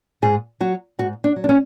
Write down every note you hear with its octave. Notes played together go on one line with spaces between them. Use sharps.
G#2 G#4
F#3 F#4
G#2 F#4
D4
F#3
D4
C#4